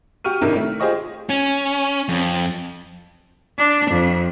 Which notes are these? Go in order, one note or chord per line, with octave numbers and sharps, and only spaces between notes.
F#4 G4 C#6 F6 D#7
G#1 C3 D#3 D4 E4 A#4
A3
F4 G4 G#4 C5 D#5 C#6
C#4
F2
D4
F2